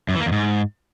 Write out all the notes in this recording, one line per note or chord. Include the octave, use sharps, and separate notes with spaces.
F#2
E3
A#3
E2
G#2